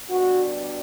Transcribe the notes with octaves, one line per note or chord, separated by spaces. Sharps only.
B2 G3 D4 F#4